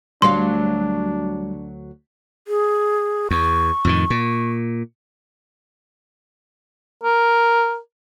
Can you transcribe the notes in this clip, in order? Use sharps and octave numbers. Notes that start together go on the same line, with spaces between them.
D2 F#3 G3 D4 F5 C6
G#4
E2 C#6
F2 A2 D#3
A#2
A#4